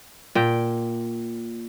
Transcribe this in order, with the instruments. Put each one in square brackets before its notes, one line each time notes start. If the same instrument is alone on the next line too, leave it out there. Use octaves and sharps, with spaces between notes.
[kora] A#2 G5